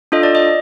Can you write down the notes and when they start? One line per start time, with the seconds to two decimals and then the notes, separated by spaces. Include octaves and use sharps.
0.12 D4 F4 A4 D#5
0.23 D5
0.35 D#5